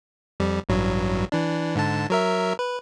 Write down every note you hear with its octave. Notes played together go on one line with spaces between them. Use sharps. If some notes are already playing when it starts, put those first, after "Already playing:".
F2 G3
A1 G2 F#3
E3 D4
G#2 D3 A5
F#3 A#4 E5
B4